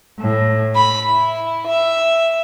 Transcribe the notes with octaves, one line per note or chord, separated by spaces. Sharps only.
A2
B5
E4
E5